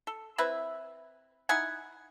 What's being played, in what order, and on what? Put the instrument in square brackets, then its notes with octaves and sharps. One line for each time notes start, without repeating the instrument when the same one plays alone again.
[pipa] A4
C4 E4 B4 E5
D#4 E4 F#5 G#5